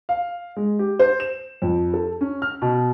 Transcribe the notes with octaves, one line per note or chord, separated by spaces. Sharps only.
F5
G#3
G4
C5
E7
F2
A4
C#4
F6
B2